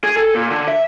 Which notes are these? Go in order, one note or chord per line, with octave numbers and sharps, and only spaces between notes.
G#4
A4
A#2
D3
E5